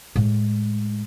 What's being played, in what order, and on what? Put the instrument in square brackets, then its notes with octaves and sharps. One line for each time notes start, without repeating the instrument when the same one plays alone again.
[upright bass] A2 G#3